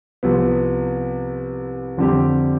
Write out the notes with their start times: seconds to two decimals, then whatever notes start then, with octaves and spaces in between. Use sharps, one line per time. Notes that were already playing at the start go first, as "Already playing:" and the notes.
0.23 C2 C3 F3 B3
1.98 F2 D3 G3 C4 G4